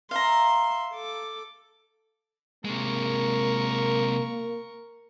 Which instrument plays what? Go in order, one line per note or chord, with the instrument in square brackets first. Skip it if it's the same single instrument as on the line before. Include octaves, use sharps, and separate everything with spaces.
[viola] E5 C6 [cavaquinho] F5 A#5
[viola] A4 D6
[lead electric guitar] C3 G#3 [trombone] A#3 [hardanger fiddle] A#4 C#6